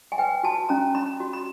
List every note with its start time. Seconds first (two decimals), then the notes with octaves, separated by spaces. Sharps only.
0.12 G#5
0.18 B4 G5
0.43 F#4 A5
0.69 C#4 A#5
0.95 C#4 B5
1.20 F#4
1.33 B5